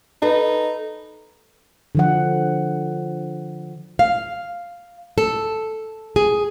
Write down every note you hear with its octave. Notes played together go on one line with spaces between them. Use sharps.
D#4 A4 B4
D3 F3 F#5
F5
A4
G#4